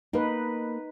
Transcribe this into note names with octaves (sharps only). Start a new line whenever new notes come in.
A#3 D#4 B4